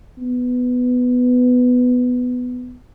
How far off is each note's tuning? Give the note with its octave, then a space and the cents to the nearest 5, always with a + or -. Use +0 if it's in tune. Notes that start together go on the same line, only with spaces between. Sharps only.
B3 +10